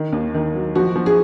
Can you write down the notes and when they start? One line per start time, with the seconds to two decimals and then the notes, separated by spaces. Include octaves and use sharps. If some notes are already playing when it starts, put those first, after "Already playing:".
Already playing: D#3
0.13 D#2
0.34 D#3
0.55 F#3
0.75 F3 F#4
0.96 F3
1.06 G#4